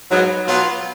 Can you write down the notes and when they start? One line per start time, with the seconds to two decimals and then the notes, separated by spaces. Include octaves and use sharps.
0.10 G#2 F#3 B3
0.46 B2 F#3 B3 F4